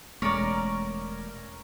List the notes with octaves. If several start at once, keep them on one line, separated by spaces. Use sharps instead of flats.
E1 G#3 A3 C#4 A#4 C#5 D5 A#5